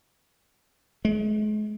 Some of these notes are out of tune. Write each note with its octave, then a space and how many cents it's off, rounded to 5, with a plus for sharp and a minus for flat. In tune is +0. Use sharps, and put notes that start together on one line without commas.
G#3 +40